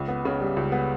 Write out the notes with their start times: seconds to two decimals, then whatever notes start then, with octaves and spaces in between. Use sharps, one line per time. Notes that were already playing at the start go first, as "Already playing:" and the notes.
Already playing: C#2
0.08 B3
0.25 C#3
0.41 G3
0.56 C#2
0.72 B3